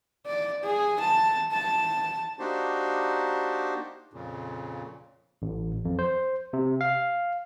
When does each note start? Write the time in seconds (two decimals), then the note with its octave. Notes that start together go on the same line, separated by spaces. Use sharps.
0.26 D5
0.63 G#4
1.00 A5
1.52 A5
2.38 A#3 D4 D#4 F#4 G4 C5
4.13 F2 A#2 C#3
5.42 A1
5.85 F2
5.99 C5
6.53 C3
6.81 F5